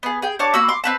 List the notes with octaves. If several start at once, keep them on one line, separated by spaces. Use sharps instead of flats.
B3 G#4
G#4 G5
D4 C#5 A5 D6
A#3 F#4 B5 E6
C6 D6
C4 B4 A5